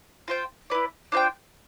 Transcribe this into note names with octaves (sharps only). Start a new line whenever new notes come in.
F4 C5 G5
E4 B4 D5
D4 F4 C5 G5